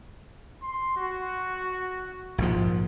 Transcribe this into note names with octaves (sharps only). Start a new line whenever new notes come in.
C6
F#4
A#1 G#2 F3